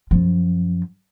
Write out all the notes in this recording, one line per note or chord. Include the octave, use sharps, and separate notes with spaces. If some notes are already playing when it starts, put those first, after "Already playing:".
F#2 F3